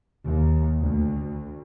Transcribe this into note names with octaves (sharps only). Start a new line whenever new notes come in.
D#2
D2